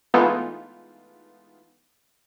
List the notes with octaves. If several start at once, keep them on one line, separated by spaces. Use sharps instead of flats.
E3 G#3 A3 B3 D#4 F4